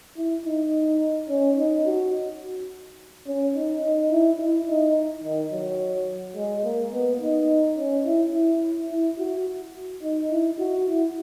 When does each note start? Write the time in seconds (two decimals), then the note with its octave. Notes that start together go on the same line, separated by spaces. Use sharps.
0.17 E4
0.46 D#4
1.29 C#4
1.58 D#4
1.86 F#4
3.26 C#4
3.55 D#4
3.83 D#4
4.11 E4
4.39 E4
4.68 D#4
5.24 D#3
5.52 F#3
6.36 G#3
6.64 A#3
6.93 B3
7.21 D#4
7.77 C#4
8.05 E4
8.34 E4
8.90 E4
9.18 F#4
10.02 D#4
10.30 E4
10.59 F#4
10.87 E4